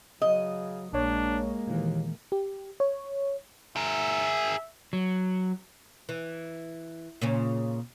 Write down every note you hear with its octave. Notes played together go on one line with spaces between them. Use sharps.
C#3 F#3 D#5
A#1 G#3 A#3 D4 C#5
D#2 A#2 D#3 E3
G4
C#5
G#4 A#4 E5
F#3
E3
A#2 C#3 C#4